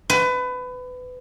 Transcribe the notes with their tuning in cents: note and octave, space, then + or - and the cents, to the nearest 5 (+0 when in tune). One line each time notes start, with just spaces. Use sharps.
B4 +25